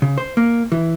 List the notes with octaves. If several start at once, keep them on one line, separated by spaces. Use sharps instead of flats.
C#3
C5
A#3
E3